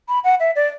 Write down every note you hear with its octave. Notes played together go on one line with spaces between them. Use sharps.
B5
F#5
E5
D5